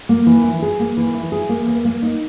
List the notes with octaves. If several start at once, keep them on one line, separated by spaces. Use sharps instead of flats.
A#3
E3
E4
G#4
A#3
E3
E4
G#4
A#3
E2
A#3
D#4